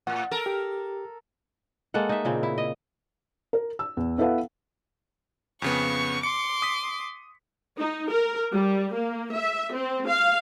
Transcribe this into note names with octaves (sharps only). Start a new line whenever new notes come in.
A2 F#5
A4 A#4
G4
G#3 A#3 A4 F#5
D#4 E5
A#2 C#3 C4
E4
D#5
A#4
E6
E2
B3 E4 A4 B4 F5 F#5
F2 C#3 B3 C#6
C6 D6 C#7
D#6 B6
D#4
A#4
G3
A#3
E5
C4
F5